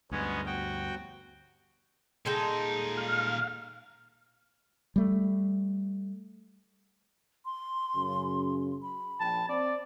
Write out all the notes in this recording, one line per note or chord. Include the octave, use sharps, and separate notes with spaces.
D2 G2 G#3 B3 C#4
F#4 G5
A#2 G#3 D#4 A4 G5
F5
G3 A3
C6
F#2 C#3
B5
A#1 G5 A5
C4 D5